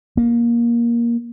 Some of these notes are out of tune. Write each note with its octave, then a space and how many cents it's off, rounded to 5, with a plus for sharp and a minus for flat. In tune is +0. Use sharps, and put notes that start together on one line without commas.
A#3 +15